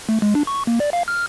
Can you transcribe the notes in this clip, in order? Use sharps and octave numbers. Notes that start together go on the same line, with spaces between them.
A3
G#3
D4
C#6
A#3
D5
F5
F6